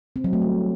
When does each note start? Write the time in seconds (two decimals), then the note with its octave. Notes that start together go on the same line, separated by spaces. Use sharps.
0.16 C4
0.24 F#3
0.33 A3
0.42 G3